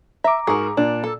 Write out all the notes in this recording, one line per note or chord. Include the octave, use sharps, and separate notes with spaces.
E5 A#5 D6
G#2 F#4 G#4 A#4
A#2 D4
A4